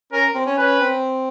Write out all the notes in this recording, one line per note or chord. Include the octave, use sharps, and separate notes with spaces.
C#4 A#4
C4
C#4
C#4 B4
C4